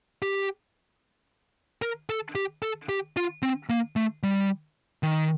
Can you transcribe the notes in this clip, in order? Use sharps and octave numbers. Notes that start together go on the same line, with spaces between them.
G4
A#4
A4
G4
A4
G4
F4
C4
A#3
A3
G3
D#3